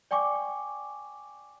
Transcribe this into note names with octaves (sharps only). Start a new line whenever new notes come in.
D5 G5 G#5 C#6 D6